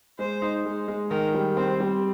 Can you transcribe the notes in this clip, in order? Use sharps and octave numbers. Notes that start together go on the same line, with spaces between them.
G#3 C5
D#4
G#3
G#3
D#3 A#4
G3
C4 C5
G3